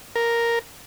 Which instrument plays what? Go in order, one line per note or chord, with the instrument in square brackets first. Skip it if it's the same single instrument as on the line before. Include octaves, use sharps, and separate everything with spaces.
[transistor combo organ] A#4